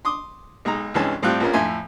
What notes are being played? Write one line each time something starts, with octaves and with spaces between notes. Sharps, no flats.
C6 D6 D#6
B1 G#3 D#4 A#5
C2 G2 E3 G#3 C#4 A5
A2 G3 C4 F4 F#6
A#1 F3 A#3 B3 C#4 A#4
F2 A2 E5 G#5 C6